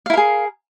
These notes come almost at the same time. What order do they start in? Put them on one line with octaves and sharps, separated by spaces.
F5 E4 A#4 G#4